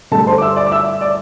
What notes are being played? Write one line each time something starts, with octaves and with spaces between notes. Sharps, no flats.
G2 D3 A3 A4 A5
C5 C6
D6
E5 E6
D5 D6
D6
E5 E6
D5 D6